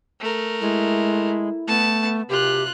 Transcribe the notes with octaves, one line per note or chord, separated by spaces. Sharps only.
A3 A#4
G#3 E4
A3 B3 A5
C#2 F#2 C3 F4 G4 F#6